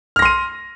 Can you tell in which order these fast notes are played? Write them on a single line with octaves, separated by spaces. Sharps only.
F6 A#6 C6 D#7